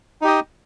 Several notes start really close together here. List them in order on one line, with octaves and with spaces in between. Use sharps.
D#4 G4 D#5